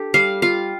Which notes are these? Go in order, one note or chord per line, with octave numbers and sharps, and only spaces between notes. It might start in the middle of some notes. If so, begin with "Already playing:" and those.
Already playing: D4 G4 A4
G3 F5
F4 F5